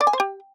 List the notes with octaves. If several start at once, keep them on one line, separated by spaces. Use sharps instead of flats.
D5
G#5
C5
G4